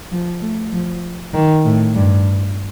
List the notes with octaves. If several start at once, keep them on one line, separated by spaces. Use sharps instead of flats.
F3
A3
F3
D#3
A2
G2